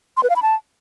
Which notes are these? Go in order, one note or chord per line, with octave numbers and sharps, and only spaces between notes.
C6
B4
F5
B5
A5